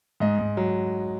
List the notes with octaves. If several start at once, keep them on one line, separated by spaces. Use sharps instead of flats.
G#2 D#5
G#2
F#3